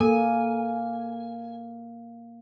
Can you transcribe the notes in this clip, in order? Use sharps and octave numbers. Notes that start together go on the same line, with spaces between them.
A#3 A4 A#4 G#5